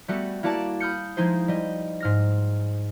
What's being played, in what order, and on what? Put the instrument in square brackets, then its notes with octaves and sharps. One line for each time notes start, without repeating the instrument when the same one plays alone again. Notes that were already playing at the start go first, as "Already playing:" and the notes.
[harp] G3 A3 B3 F#4 A4
A#3 E4 F#4 D5 A5
B5 D#6 F6 G6 C#7
F3 G#3 D#4 E4 C5
G3 D#5
G#2 F6 A#6